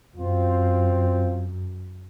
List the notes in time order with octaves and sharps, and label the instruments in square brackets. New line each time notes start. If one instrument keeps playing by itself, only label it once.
[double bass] F#2 [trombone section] C4 F4